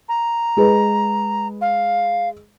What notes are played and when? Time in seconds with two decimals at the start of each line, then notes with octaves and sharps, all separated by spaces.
0.09 A#5
0.57 G#3 G#4 B4
1.61 F5